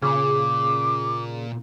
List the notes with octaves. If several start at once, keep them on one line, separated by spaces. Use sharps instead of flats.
A#2 C#3 D6